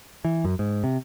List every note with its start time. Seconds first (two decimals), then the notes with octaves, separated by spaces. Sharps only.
0.25 E3
0.45 F#2
0.59 G#2
0.84 C3